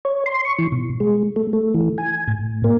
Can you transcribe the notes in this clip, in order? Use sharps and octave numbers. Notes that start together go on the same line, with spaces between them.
C#5
C6
C#6
E3
B2
G#3
A3
A3
E3
G#5
A2
A#3